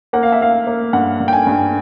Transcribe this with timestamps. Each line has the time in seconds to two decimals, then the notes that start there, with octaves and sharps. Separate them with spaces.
0.13 A#3 F#5
0.23 F5
0.32 E5
0.41 A#3 F5
0.67 A#3
0.93 G2 F#5
1.20 G2
1.28 G5
1.33 G#5
1.47 G2